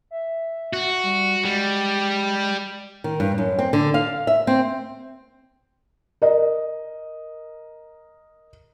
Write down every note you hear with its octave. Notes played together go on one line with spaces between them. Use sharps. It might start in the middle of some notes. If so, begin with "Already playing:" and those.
E5
F#4
G3
G3 G#3
D#3
G2
F#2
C4
D3
F5
E5
C4
A#4 D#5